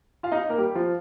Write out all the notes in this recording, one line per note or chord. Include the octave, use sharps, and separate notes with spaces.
F4 F5
D#4 D#5
A#3 A#4
G3 G4
F3 F4